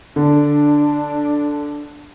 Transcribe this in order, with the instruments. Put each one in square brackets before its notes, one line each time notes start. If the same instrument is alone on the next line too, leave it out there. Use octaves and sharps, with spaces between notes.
[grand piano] D3 [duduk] D4